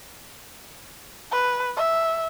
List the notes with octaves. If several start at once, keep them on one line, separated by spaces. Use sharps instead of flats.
B4
E5